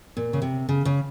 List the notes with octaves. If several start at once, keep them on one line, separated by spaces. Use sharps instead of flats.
A#2
C#3
C3
C#3
C#3